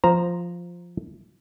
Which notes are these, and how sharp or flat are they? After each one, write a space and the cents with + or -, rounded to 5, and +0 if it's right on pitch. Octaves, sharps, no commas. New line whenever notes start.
F3 +0 C5 +0 A#5 +0